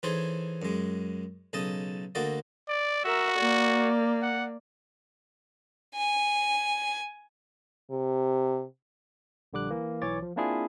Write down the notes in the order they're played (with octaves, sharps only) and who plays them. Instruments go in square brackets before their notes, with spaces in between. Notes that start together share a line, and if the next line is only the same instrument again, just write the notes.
[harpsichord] E3 D#4 G#4 A4 C5 C#5
F#2 G#3
B1 C#3 A4 D#5 A5 D#6
D2 A#3 F#4 A4 D5 D#5
[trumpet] D5
[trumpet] F#4 [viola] A#4 E5
[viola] A#3 D5
[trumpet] F#5
[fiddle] G#5
[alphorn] C3
[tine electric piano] A#1 D3 G3 D6 F#6
E3 A#3
B1 E3 C#5 D6 A6
F3
A#3 C4 D4 E4 F4 G#4